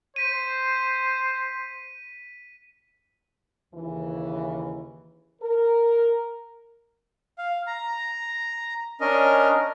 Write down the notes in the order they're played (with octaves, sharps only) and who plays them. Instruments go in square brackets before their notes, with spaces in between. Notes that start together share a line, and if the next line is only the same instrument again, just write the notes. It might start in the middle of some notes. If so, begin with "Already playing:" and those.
[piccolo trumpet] C5 [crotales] B6 D#7
[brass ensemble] D#2 C#3 E3
A#4
[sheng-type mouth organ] F5
A#5
C#4 D4 A#4 D#5